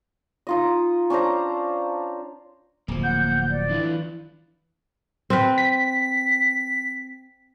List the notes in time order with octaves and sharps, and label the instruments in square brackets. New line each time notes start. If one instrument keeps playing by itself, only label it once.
[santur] D#4 F4 D#5
C#4 D4 C5 A#5
[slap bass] D1 F3 [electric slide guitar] A#3
[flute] F#5 [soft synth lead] G6
[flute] D5
[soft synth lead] E3 [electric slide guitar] D4 F4 B4
[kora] C4 B4
[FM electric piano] B6